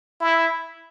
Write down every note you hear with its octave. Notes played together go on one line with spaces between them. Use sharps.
E4